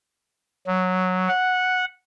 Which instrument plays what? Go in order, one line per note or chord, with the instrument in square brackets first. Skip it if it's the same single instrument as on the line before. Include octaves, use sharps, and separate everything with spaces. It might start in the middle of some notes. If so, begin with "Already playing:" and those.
[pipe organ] F#3
F#5